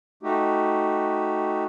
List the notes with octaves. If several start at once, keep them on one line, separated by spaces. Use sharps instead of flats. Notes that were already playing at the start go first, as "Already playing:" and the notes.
A3 D#4 F#4 G4